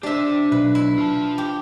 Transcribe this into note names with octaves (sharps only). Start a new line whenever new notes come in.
D4 G4 C5 E5
B1 B4
E4
F4 A5
G4